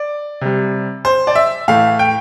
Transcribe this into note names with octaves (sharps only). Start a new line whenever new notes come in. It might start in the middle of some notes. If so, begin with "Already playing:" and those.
Already playing: D5
C3 G3
C5
D5
E5
A2 E3 A3 F5
G5